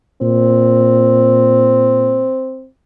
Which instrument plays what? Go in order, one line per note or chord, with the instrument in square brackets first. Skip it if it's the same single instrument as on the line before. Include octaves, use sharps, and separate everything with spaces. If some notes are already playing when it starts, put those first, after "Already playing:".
[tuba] A#2 [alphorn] C4